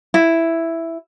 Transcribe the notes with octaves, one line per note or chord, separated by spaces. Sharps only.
E4